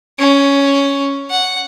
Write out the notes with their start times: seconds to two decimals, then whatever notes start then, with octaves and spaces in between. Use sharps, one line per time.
0.19 C#4
1.30 F#5